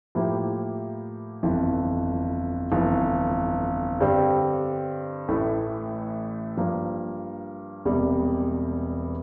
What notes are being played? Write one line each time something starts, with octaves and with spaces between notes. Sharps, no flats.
A2 F3 A#3 E4 G4
G1 F2 E3
G1 F2 E3
G2 D3 G3 C4 G4
A1 A2 E3 A3
G2 F3 A#3
E1 E2 C3 G3